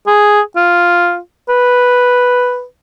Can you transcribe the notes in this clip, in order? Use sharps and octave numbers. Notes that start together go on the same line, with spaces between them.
G#4
F4
B4